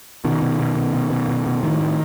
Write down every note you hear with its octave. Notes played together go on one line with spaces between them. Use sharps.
B2 D#3
B2
B2
B2
B2
B2
B2
B2
A2 D#3
A2